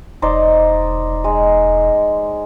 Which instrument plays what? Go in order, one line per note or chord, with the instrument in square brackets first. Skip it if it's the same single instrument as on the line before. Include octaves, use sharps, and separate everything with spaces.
[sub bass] E1 [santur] D#4 C5 D5
[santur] G#3